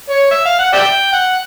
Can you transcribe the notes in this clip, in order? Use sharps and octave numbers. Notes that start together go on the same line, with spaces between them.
C#5
E5
F5
F#5
D5 E5 G5
F#5